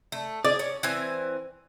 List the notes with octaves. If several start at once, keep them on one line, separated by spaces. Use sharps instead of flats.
A3
G#4 D5
C#4
E3 C4 G#5